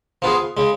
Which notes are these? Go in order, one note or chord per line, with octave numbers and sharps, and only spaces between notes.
F3 B3 F4 G#4
C#3 G#3